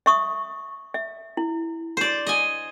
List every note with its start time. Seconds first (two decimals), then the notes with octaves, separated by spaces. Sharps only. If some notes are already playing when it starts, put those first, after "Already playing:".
0.06 E5 C#6 D#6
0.94 E5
1.37 E4
1.97 C5 D5
2.27 D#5 G#5